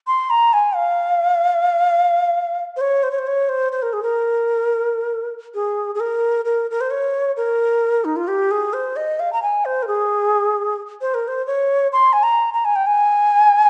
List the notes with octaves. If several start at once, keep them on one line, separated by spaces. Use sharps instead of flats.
C6
A#5
G#5
F5
C5
C#5
C5
C#5
C5
C#5
C5
C5
A#4
G#4
A#4
G#4
G#4
A#4
A#4
A#4
C5
C#5
A#4
D#4
F4
G4
G#4
C5
D#5
F5
A#5
G#5
C5
A#4
G#4
C5
A#4
C5
C#5
C6
G#5
A#5
A#5
G#5
G5
G#5